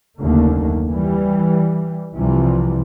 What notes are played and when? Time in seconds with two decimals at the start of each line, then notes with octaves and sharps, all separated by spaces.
0.20 F#1 D#2 D3 A3 A#3
0.90 E3 G3
2.15 C2 C3 E3 F3 G3